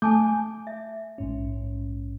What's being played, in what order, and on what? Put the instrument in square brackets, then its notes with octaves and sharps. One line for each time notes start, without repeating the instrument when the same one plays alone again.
[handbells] A3 G6 [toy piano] G#5 A5 D6
[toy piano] E5
[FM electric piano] A#1 G#2 C#4